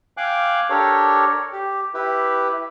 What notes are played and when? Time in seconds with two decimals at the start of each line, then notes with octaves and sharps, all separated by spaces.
0.17 F5 G5 G#5 D6 F#6
0.70 D4 G4 A4 A#4 C#5
1.52 G4
1.94 E4 G4 B4